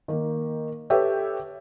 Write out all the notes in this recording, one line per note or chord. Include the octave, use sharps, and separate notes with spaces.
D#3 A#3
G4 A4 B4 C#5 E5 G5